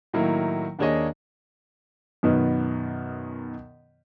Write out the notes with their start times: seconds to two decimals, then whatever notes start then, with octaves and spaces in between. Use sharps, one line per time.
0.13 A2 D#3 F#3 A#3 E4
0.79 D#2 A#3 D4 G#4 C#5 D#5
2.23 F#2 B2 D#3 B3